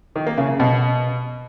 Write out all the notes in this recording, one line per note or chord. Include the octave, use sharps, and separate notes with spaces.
D#3
A#3
C#3
C#3
B2